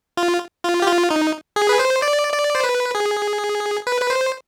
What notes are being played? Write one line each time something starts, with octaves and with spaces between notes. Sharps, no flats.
F4
F4
G4
F4
D#4
G#4
B4
C5
D5
D5
C5
B4
G#4
B4
B4
C5